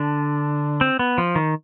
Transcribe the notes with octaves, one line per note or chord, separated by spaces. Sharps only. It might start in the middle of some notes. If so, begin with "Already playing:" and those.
Already playing: D3 D4
C4
B3
F3
D#3